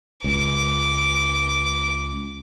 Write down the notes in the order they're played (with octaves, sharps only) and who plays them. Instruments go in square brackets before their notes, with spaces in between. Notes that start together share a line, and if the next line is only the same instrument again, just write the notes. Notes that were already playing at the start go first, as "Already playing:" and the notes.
[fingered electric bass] C#2 [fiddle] D6